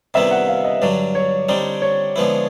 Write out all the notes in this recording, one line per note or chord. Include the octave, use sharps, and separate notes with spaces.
C3 D#3 G3 B3 E4 E5
F#5
F5
D#5
G2 D3 F#3 D5
C#5
D3 G3 C4 D#4 D5
C#5
D3 F3 G#3 B3 E4